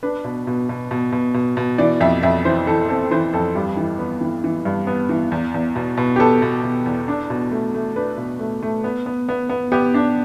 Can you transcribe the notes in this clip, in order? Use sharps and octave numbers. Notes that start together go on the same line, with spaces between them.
D4 B4
B2
B2
B2
B2
B2
B2
B2
E3 D5
F2 E5
F2 E5
E3 C5
E3 A4
C4 A4
E3 C5
F2 A4
G2 G4
E3
B3
E3
E3
G2
B3
E3
E2
E2
B2
B2
G4
B3 A4
B2
B2
E2
D4
B2
A3
A3
D4 B4
B2
A3
A3
B3
B3
B3
B3
B3 G4
D4